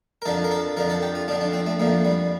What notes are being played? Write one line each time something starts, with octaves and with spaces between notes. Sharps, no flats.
A#4
F2 D3 F3 A4
A#4
A4
F2 D3 F3 A#4
A4
G4
F4
F2 D3 F3 D4
D4
C4
A3
F2 D3 F3 A#3
G3